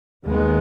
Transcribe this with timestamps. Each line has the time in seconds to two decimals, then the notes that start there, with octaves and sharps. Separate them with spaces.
0.26 D#2 D#3 G#3 B3